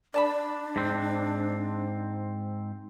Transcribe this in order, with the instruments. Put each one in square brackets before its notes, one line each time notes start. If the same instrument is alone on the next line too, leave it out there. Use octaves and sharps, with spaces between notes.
[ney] D4 [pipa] D5 A5 B5
[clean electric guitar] G#2 C4